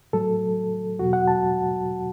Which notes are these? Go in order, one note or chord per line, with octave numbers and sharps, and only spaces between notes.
A2 F#3 A4
E2 B2 F#3 F#4
F#5
A5